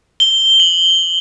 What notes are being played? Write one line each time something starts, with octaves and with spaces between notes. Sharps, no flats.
G7
F#7